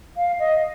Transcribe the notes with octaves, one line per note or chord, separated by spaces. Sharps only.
F5
D#5